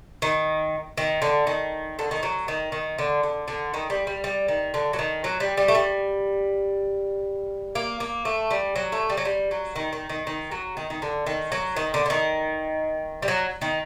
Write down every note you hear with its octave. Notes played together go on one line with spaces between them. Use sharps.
D#3
D#3
D3
D#3
D3
D#3
F#3
D#3
D#3
D3
D3
D3
D#3
G3
G3
G3
D#3
D3
F#3
D#3
F#3
G3
G3
A3
G3
A#3
A#3
A3
G3
F#3
A3
G3
F#3
G3
F#3
D#3
D#3
D#3
D#3
F#3
D#3
D#3
D3
D#3
F#3
D#3
D3
D3
D#3
G3
F#3
D#3